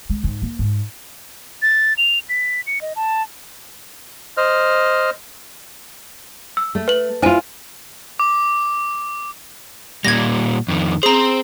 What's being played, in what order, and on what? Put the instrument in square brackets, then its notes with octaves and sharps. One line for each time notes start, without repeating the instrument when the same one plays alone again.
[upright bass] G#3
G#2
A#3
G#2
[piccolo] A6
F7
B6
C#7
D#5
A5
[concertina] C5 D#5 F6
[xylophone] E6
[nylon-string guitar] A3
[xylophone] B4 F#7
[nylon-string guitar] E4 F4 [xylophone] C5 G#5 D#7
[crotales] D6
[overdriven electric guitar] A#2 G3 [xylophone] G#6 A#6
[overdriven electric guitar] F2 D#3
[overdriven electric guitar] C4 C5 [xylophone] G#4 A#5